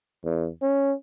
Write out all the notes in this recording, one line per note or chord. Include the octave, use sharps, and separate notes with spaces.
E2
C#4